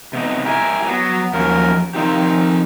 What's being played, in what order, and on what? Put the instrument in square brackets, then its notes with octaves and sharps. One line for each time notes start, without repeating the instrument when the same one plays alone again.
[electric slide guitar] C3 B3 D#4
[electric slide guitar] E4 G4 A#4 [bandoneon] G#5
[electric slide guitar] F#3 [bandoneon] B3
[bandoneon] D#2 A#4 [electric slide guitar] F3 F#3 C#4
[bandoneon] D#3 D#4 [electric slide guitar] F3 C4 G4